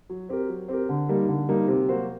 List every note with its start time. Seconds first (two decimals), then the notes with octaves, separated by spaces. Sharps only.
0.09 F#3
0.29 C4 G4 A#4
0.49 F#3
0.68 C4 G4 A#4
0.89 D3
1.09 G3 A#3 D#4
1.28 D3
1.49 G3 A#3 D#4
1.68 C3
1.88 F#3 A#3 F#4 C5